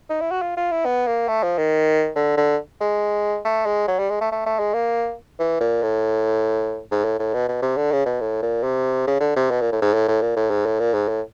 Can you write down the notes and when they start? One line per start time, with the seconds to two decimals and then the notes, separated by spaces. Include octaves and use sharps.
0.10 D#4
0.21 E4
0.31 F#4
0.42 F4
0.57 F4
0.71 E4
0.86 B3
1.07 A#3
1.28 A3
1.43 F3
1.58 D#3
2.15 D3
2.37 D3
2.80 G#3
3.45 A3
3.66 G#3
3.88 F#3
3.99 G3
4.10 G#3
4.21 A3
4.32 A3
4.46 A3
4.59 G#3
4.74 A#3
5.39 E3
5.61 A#2
5.83 A2
6.91 G#2
7.04 A2
7.19 A2
7.34 B2
7.48 B2
7.62 C3
7.77 D3
7.92 C#3
8.06 B2
8.20 A2
8.42 A#2
8.63 C3
9.07 C#3
9.21 D3
9.36 C3
9.51 B2
9.61 A#2
9.72 A2
9.82 G#2
9.94 A2
10.08 A2
10.22 A#2
10.36 A2
10.50 G#2
10.66 A2
10.79 A#2
10.94 G#2
11.08 A2